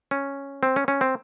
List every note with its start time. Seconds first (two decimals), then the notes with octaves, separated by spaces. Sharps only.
0.11 C#4
0.63 C4
0.76 C#4
0.88 C#4
1.01 C4